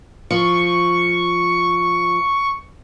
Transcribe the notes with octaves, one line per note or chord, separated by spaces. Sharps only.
F3 C#6